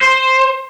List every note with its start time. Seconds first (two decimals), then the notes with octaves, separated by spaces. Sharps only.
0.02 C5